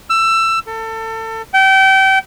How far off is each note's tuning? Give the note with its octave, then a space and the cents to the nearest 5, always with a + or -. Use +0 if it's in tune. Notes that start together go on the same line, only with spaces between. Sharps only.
E6 +20
A4 +30
G5 -30